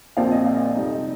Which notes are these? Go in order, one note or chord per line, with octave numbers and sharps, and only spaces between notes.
A#1 A#2 F3 C4 F5
D#5
F5
D#5
D5
F2 C3 G3 C4 D#4